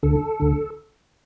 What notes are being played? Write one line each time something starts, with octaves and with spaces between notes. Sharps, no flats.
D2 D3 A4
D2 D3